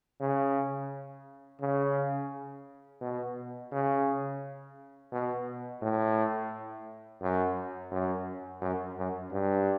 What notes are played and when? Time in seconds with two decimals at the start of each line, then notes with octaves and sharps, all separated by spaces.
0.21 C#3
1.61 C#3
3.01 B2
3.72 C#3
5.12 B2
5.82 A2
7.22 F#2
7.92 F#2
8.62 F#2
8.97 F#2
9.32 G2